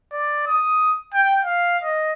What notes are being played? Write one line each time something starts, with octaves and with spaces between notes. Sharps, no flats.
D5
D#6
G5
F5
D#5